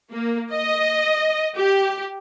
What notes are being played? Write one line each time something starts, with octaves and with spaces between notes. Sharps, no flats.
A#3
D#5
G4